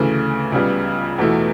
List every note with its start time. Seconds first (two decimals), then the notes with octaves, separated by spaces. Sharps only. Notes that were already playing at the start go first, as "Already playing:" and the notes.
Already playing: D2 C#3 E3 A3
0.52 C#2 C#3 G3 B3
1.18 E2 B2 A3 E4